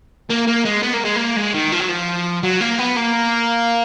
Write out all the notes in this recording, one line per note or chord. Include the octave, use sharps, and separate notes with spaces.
A#3
A#3
G#3
B3
A#3
G#3
A#3
G#3
D#3
F3
F#3
F3
F#3
A#3
B3
A#3